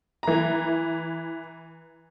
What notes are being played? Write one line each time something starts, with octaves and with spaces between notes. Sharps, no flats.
E3 A#5